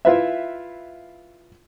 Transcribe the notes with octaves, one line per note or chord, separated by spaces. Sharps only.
E4 F4 B4 E5